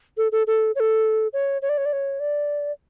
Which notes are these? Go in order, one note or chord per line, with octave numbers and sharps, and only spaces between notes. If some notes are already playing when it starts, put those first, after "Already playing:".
A4
A4
A4
C#5
A4
C#5
C#5
D5
C#5
D5
C#5
D5